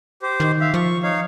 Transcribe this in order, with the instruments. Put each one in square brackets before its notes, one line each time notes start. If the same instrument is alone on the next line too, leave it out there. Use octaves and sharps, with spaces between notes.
[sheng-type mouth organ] G4 C5
[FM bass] D#3
[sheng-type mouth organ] E5 F5
[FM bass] F3 [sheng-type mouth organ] C#6
[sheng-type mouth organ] D#4 C#5 F5